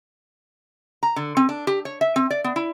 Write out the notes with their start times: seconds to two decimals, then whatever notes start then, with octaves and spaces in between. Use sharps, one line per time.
1.03 A#5
1.16 D3
1.37 C4
1.49 D4
1.67 G4
1.85 C#5
2.01 E5
2.16 C4
2.31 D5
2.44 B3
2.56 E4